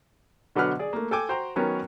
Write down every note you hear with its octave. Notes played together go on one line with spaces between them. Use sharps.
B2 D3 F#3 B4 F#5 F6
G#4 D5
A3 A#3
A4 G5 G#5 D6
F#4 C5 G5 A#5
D#3 F#3 B3 C#4 A#4